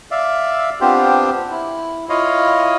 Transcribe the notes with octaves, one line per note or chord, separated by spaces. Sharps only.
D5 E5 F5
B3 C4 D4 F4 G4 C5
E4
E4 F4 C#5 D#5 F5